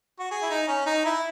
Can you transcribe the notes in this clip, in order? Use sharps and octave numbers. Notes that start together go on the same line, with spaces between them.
F#4
G#4
E4
D#4
C#4
D#4
E4